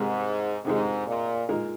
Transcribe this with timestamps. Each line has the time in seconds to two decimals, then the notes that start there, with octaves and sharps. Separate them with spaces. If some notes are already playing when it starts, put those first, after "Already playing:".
Already playing: G#2 C3 D#3 G#3
0.65 G#2 C3 D#3 G#3
1.07 A#2
1.49 A#2 G#3 D#4 A#4